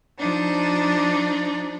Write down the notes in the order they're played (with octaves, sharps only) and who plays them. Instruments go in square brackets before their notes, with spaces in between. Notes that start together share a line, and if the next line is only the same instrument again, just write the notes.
[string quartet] F3 D4 D#4